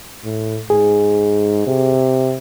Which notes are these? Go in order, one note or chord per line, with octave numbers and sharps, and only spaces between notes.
A2
G#2 G#4
C3